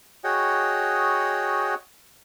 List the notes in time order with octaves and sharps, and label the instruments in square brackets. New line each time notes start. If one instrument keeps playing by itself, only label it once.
[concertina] F#4 G#4 C#5 D#5 F#5 G5